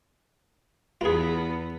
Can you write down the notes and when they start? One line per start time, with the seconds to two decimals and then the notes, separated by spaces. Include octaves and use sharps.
1.01 E2 B3 F4 G#4